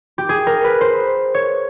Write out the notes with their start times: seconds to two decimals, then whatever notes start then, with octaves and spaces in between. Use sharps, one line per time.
0.18 G4
0.29 G#4
0.47 A#4
0.64 B4
0.81 C5
1.34 C#5